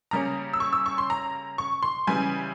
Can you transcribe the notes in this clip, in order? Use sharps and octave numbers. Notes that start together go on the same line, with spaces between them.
C#3 G3 A#3 C#4 A#5
E6
C#6
E6
C#6
C6
A#5
C#6
C6
C#3 E3 G3 G#5